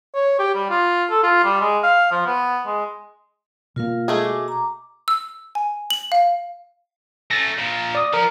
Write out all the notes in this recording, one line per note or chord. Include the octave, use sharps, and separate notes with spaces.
C#5
G4
G3
F4
A4
F4
G3
G#3
F5
F3
B3
G#3
B2 A#3 F4 A#4 F5
G#3 A3 G#4
F#4 D6
A#5 D6
E6
G#5
F#7
F5
A3 C#4 A6 A#6
A#2 F3
D5 D#6
F3 A#4